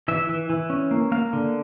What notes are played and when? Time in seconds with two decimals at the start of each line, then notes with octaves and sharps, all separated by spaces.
0.08 E3 E5
0.29 E3
0.50 E3
0.70 C#4
0.91 A#3
1.12 A#3 F5
1.33 D3